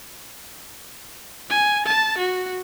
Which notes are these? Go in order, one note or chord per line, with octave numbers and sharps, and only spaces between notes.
G#5
A5
F#4